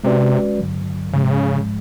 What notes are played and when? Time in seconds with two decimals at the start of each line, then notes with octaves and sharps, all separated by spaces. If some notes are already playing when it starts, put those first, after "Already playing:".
0.04 C3 G#3 C#4 F#4 B4 D5
0.58 G2 D3 F#3
1.13 G#2 C#3 F3 G#3
1.23 C3
1.31 C#3